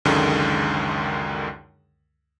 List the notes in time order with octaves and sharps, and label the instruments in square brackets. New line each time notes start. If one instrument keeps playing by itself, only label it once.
[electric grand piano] C#2 F#2 D3 D#3 G#3